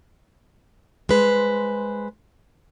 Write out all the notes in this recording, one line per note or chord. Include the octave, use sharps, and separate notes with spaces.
G#3 B4 C5